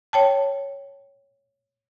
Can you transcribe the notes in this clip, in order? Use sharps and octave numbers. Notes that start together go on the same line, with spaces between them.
C#5 G5 A5